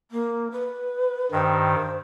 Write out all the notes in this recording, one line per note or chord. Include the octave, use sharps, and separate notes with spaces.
A#3
B4
G2 D#3 C5